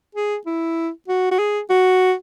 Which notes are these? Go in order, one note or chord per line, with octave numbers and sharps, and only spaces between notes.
G#4
E4
F#4
F#4
G#4
F#4